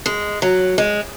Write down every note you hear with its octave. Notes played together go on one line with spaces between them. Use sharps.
G#3
F#3
G#3